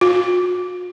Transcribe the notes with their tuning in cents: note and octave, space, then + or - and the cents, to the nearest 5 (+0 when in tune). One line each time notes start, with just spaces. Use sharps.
F#4 -40